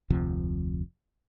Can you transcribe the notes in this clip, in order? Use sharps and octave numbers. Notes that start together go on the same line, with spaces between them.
F1 D2 C3 F3